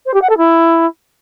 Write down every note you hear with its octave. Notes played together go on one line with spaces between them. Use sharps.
C5
G4
F#5
A4
E4